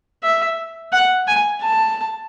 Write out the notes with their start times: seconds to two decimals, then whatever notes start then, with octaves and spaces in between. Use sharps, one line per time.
0.23 E5
0.92 F#5
1.28 G#5
1.62 A5